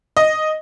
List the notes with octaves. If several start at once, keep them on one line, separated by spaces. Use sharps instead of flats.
D#5